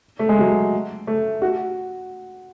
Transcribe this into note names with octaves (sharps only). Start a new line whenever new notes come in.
A3
G#3
F#3
A3
F#4